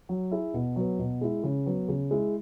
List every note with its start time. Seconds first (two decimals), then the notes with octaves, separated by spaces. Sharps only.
0.09 F#3
0.31 E4 G#4
0.54 B2
0.76 F#3 B3
0.99 B2
1.21 G#3 E4
1.44 C#3
1.66 F#3 B3
1.89 C#3
2.11 G#3 E4